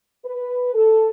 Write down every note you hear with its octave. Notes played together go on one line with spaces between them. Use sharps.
B4
A4